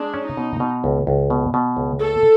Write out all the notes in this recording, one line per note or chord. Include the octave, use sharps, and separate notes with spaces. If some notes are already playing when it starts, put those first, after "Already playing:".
Already playing: G#3 D4
C#4
D#4
B2
B2
C#2
C#2
B2
B2
C#2
A3 A4